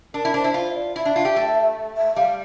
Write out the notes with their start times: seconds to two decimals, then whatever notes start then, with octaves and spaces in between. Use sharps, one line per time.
0.14 D4 A#4
0.25 E4
0.34 D4 C5
0.44 E4
0.54 F4 C5
0.70 E5
0.75 D5
0.95 E4 E5
1.05 D4
1.16 F4
1.25 G4
1.36 A3
1.96 E5
2.16 G3 F5